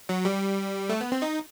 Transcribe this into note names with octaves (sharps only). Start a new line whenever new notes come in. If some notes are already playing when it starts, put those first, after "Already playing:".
F#3
G3
A3
B3
C4
D#4